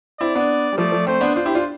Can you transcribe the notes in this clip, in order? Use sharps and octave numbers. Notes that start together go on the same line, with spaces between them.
C4 E4 D5
B3 D4
G3
F3 A3 D5
F3 A3
A3 C4 C5
B3 D4
D4 F4 C5
E4 G4
D4 F4